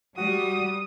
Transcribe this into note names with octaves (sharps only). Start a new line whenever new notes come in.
G3 F#4 D#6